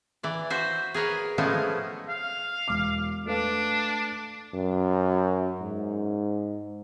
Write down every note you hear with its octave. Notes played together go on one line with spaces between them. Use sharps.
E3 D5
F#4 C5 E5
G#4 A#4 B4 C#5
F3 G#3 A3 B3 C#4 E4
F5
E1 D6
A3 D4 B4 F5
F#2
G#2